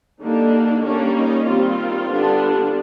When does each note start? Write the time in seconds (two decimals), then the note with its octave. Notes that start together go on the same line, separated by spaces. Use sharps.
0.21 D3 G3 A#3 D4 D#4
0.85 G3 A#3 C#4 D4
1.16 D#4
1.47 D#3 G3 C4 F4
2.11 D3 G3 B3 D4